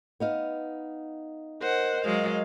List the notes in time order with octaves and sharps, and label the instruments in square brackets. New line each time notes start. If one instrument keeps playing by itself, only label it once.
[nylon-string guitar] B3 D#4 F5
[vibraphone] A#4 D#5 [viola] C5 F#5
[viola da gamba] F#3 G#3 [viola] F5